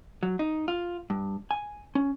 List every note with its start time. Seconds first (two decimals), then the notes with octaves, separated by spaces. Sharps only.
0.23 F#3
0.39 D#4
0.68 F4
1.10 G2
1.51 G#5
1.95 C#4